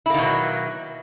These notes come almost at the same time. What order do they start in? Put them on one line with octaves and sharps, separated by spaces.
E4 A#3 D#3 B2 F#3